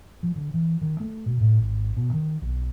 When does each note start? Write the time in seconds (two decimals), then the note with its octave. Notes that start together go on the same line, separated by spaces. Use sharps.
0.23 F3
0.36 D3
0.54 E3
0.81 D#3
1.00 A3
1.26 B2
1.40 A2
1.59 G#1
1.97 B2
2.13 D#3
2.42 B1